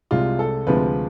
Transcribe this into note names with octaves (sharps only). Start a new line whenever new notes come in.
C2 C3 G#3 F4
A4
D2 C3 F3 G#3 B4